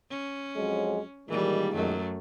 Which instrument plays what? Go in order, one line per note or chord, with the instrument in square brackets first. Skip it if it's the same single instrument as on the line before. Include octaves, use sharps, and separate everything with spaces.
[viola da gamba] C#4
[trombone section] F2 F#3 G#3
[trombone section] A#2 D#3 G#3 [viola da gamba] E3 G3
[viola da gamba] F#2 A3